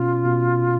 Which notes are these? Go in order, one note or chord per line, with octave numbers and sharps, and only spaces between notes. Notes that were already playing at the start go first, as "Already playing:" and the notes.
Already playing: B2 C#4 F4
B2